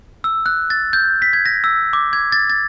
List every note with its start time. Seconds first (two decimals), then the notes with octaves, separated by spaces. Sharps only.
0.24 E6
0.46 F#6
0.70 A6
0.93 G6
1.22 B6
1.33 G#6
1.46 A#6
1.64 E6
1.93 D6
2.13 G#6
2.32 A6
2.50 A6